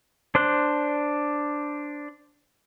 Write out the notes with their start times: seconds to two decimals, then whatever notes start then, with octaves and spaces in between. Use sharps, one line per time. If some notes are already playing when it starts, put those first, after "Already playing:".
0.35 D4 C5 F#6